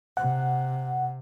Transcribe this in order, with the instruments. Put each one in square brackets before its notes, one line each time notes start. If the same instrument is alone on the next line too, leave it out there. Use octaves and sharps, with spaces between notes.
[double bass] C3 [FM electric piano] F#5